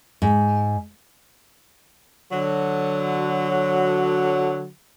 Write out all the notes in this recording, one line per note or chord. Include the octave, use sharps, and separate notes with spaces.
G#2
D3 F#3